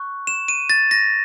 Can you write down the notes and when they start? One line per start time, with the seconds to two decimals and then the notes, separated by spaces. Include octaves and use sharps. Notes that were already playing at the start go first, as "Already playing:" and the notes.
Already playing: C#6 F#6
0.27 E7
0.48 D#7
0.70 A6
0.91 A#6